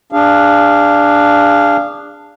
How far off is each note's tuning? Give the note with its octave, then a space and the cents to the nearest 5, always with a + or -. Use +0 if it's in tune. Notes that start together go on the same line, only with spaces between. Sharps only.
D4 +0 G#4 -30 F5 -15